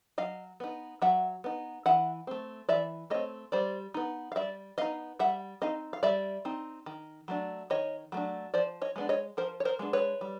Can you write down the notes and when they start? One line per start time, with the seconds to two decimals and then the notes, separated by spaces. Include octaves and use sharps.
0.18 F#3 D#5 F5
0.60 B3 D#4
1.02 F#3 E5 F#5
1.44 B3 D#4
1.86 E3 E5 F#5
2.27 A3 C4
2.69 E3 D5 E5
3.10 A3 C4 C#5 D#5
3.52 G3 C5 D5
3.94 B3 D#4
4.32 F5
4.36 G3 D5 E5
4.78 B3 D#4 D#5 F5
5.19 G3 E5 F#5
5.62 C4 D#4 D#5 F5
5.93 F5
6.03 G3 D5 E5
6.45 C4 D#4
6.86 D#3
7.28 F#3 A3 D4
7.70 D#3 C#5 D#5
8.12 F#3 A3 D4
8.54 F3 C5 D5
8.82 C#5 D#5
8.96 G#3 B3 D4
9.09 C#5 D#5
9.37 F3 A#4 C5
9.60 C#5
9.65 A#4 C5
9.79 G#3 B3 D4
9.93 B4 C#5
10.21 G3